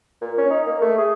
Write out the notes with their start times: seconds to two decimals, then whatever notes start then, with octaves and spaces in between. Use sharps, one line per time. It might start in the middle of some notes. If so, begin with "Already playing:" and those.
0.21 A#2
0.38 C#4
0.50 D#4
0.66 A#3
0.82 A3
0.98 G#4